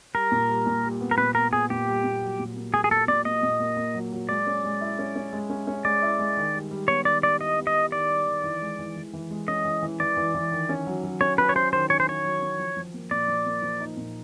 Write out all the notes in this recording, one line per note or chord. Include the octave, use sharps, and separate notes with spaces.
G3 A#4
A#2
G3
A#2
G3
B3
A#4
A#2 B4
B3 A#4
B3 G#4
A#2 G4
G3
A#2
F#3
A#2
A#3
A#3 G#4
G#4
A#2 A4
A#2 D5
A#3 D#5
A#2
A#3
A#3
F#3
F#3
G#3 D5
C#4
G#3
E4
C#4
C#4
G#3
C#4
C#4
G#3 D5
E4
G#3
D#3
G3
G3
B3 C#5
D#3 D5
B3 D5
E4 D#5
B3
D#5
E4
D#3 D5
G3
D#3
E3
G#3
E3
E3
E3
G#3
C#4 D#5
E3
E3
E3 D5
E3
E3
D#3
C#4
F#3
F#3
C#4 C#5
C#4 B4
C#5
C#4 C5
D#3 C5
C#4 C#5
C5
C#4 C#5
F#3
C#4
F3
F3
A#3
A#2 D5
F3
A#3
F3
D#4
A#2